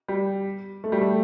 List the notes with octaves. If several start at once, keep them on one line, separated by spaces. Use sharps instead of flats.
G3
A3
G3
A3